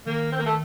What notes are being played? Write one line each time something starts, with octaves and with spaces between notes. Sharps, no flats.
D#3 A#3
C4
A#3
A3